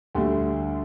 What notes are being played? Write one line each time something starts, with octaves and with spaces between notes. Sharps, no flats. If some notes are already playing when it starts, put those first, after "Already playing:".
D2 D3 G3 A3